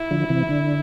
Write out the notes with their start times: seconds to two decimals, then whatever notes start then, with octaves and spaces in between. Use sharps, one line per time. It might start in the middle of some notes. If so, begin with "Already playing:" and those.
Already playing: E4
0.11 D3 F3
0.30 C3 E3
0.49 D3